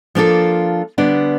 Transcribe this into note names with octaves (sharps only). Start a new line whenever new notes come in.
F3 A#3 D4 F4 A4
D3 G3 B3 D4